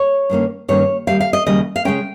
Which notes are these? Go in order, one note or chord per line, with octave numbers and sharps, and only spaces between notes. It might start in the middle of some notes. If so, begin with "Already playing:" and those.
Already playing: C#5
G2 D#3 A#3 C#4
G2 D#3 A#3 C#4 C#5
D#2 C#3 G3 F5
F5
D#5
D#2 C#3 G3 D#5
F5
C#3 G#3 C#4 G5